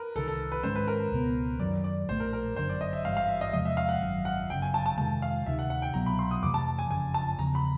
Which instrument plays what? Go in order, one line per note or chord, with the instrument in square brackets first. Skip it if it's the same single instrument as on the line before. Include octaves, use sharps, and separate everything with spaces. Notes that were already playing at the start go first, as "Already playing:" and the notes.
Already playing: [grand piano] A#4 B4
[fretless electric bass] C2 C3 D#3 [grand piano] A4
[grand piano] A4
B4
[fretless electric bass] G#2 D#3 G#3 C#4 [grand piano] C5
[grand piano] B4
A#4
[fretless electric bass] C#2 B2 G#3 B3
[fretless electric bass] F#2 D#3 F#3 [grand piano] D5
[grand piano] D5
[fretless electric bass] A#1 A2 F3 A3 [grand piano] C5
[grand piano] A#4
A#4
[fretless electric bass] G1 F#2 D3 [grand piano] C5
[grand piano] D5
D#5
E5
[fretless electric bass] G#1 G2 E3 G3 [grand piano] F5
[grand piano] F5
E5
D#5
[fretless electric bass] E2 C3 F3 G#3 [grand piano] D#5
[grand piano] E5
F5
F#5
[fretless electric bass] G#1 F#2 D#3 F#3
[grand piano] F#5
[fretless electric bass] G1 F#2 C#3 [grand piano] G5
[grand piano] G#5
A5
A5
[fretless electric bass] F2 C3 D#3 G#3 [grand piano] A5
[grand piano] F5
[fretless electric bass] D2 C3 D#3 [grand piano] E5
[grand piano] F#5
F#5
G5
[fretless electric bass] C2 B2 F#3 B3 [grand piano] A#5
[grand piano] B5
C6
D#6
[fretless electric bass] F2 C3 E3 A3 [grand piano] D6
[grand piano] A5
G#5
[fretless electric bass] F#1 F2 C#3 [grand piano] G#5
[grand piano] A5
[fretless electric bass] E2 C#3 F3 [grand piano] A#5
[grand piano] B5